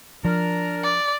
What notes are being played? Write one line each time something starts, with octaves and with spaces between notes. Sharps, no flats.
F3 D4 A#4
D5